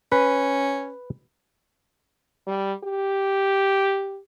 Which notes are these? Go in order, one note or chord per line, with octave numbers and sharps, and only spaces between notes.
C#4 B4
G3
G4